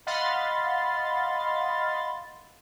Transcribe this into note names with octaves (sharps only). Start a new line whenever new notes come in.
D#5 F5 F#5 B5 C6 A6